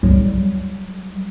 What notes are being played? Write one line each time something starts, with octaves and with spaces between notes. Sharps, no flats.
F#3 G3